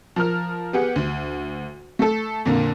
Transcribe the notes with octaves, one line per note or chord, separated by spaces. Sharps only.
F3 A#4 F6
B3 G4 G#4 F#5
D2
A3 A4
F2 A#2 D3 A#3